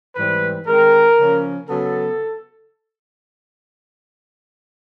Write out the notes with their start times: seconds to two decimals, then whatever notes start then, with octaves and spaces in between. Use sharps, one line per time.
0.16 G#2 E3 G3 C4 B4
0.67 D#3 G#3 C4 A#4
1.17 C#3 F3 A#3 C#4
1.68 C#3 F#3 B3 A4